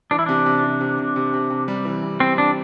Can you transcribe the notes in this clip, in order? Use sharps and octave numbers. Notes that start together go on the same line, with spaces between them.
E3 D4
E4
C3 D4
C3
C3
C3
C3
C3
C3
C3
G3
E3
C3
C3 C4
C3 D4